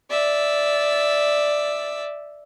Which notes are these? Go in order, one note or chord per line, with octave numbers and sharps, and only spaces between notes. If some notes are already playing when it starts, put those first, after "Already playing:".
D5 E5